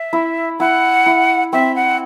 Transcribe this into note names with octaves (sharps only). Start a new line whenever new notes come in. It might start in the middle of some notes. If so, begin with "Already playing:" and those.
Already playing: E5
E4
E4 F#5
E4
C4 E5
F#5